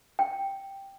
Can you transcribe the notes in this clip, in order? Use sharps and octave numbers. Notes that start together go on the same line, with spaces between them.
G5